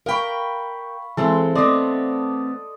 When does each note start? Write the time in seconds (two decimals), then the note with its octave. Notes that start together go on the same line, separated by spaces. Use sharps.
0.06 A#4 F5 G5 B5 C#6
1.17 E3 G#3 C4 A4 C6
1.55 A3 B3 C4 D5 D#5 C6